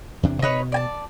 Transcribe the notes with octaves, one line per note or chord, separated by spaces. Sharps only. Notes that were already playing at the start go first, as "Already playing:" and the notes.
E2 C3 D4
B2 D#4 B4 C#5
D5 G#5 A5